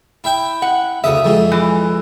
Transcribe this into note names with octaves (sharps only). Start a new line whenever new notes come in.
E4 E5 G5
F#5
D2 C#3 E5 D#6
F2 G#3
E3